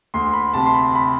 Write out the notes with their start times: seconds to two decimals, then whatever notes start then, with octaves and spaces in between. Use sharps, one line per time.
0.14 D2 C6
0.33 B5
0.54 C3 A5
0.65 C6
0.74 B5
0.95 B5